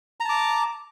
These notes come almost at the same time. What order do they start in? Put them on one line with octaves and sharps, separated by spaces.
A#5 A5 D6